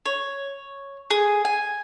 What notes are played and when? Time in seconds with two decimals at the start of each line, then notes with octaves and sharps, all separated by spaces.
0.06 C#5
1.10 G#4
1.45 G#5